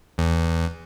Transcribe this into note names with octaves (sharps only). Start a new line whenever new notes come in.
E2